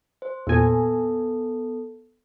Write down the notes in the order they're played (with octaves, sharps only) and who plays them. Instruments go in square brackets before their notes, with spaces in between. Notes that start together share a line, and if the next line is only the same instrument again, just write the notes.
[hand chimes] C5
[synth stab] E2 A#2 G#5 [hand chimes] B3 A4